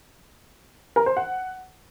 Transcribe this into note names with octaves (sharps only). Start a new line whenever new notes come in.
A#4
C5
F#5